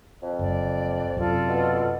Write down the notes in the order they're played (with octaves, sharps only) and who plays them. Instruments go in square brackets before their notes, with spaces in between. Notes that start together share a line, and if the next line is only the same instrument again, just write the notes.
[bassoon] F2
[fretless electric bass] F#1 [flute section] D5
[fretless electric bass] F#2 C3 [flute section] F4 A4 D5
[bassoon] B2